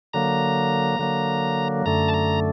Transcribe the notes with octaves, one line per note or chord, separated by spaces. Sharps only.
D3 F#3 A#3 A#5
D3 F#3 A#3
F#2 D3 A3 A#5
A5
A#5